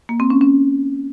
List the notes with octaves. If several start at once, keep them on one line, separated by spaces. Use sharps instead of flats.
A#3
C4
C#4
C#4